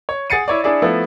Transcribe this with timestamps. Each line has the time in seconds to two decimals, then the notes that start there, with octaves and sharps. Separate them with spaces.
0.09 C#5
0.30 G#4 F#5 A6 C7 C#7 D#7
0.48 E4 C#5 D5
0.64 D4 E4 G#4 D5 E5
0.82 F3 A3 B3 E4